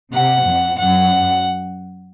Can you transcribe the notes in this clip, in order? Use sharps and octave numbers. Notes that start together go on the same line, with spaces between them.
C3 F#5
F2
F#2 F#5